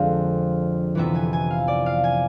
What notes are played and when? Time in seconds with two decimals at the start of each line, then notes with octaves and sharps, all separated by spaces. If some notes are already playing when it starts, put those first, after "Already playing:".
Already playing: F2 D3 F3 G#3 C4 F5
0.95 F2 C3 E3 B3 E5
1.15 G#5
1.33 G#5
1.51 F5
1.68 D5
1.86 F5
2.04 G#5